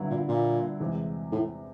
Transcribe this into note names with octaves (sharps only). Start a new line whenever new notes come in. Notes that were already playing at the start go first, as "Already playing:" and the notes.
Already playing: G2 D3 F#3 B3 E4
A#2
A#2
E2 C3 E3 G#3
A2